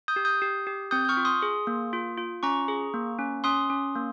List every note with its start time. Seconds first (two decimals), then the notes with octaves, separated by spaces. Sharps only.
0.08 D#6 G6
0.16 G4
0.25 D#6 G6
0.42 G4
0.67 G4
0.91 C4 D#6 G6
1.05 G6
1.09 C#6 F6
1.17 F4
1.25 C6 D#6
1.42 G#4
1.67 A#3
1.93 F4
2.17 F4
2.43 C#4 A#5 C#6
2.68 G#4
2.94 A#3
3.19 C#4
3.44 C#4 C6 D#6
3.70 C#4
3.95 A#3